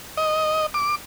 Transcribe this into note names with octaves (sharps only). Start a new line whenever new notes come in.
D#5
D6